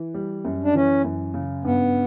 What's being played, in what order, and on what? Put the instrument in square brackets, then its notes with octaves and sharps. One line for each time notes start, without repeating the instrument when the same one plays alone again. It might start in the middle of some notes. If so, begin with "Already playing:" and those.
Already playing: [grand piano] E3
G3
F#2
[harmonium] D4
[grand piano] E3 [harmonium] C#4
[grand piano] F#2
C#3
[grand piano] G2 [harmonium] B3